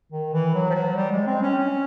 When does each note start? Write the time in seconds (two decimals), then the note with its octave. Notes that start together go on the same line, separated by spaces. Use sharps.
0.12 D#3
0.33 E3
0.54 F#3
0.69 F3
0.74 F#3
0.96 G3
1.11 G#3
1.27 C4
1.42 C#4
1.58 C#4